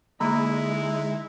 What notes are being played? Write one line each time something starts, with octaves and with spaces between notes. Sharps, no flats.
D2 G#3 A#3 D#4 E4 A#5 B5 E6